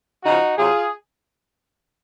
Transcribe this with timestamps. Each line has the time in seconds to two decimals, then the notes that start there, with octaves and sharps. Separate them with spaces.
0.24 C#3 F3 D#4 F#4
0.57 C3 F#3 F4 G#4